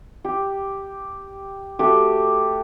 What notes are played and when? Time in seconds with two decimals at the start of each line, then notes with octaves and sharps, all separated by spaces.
0.25 G4
1.79 A3 F#4 G4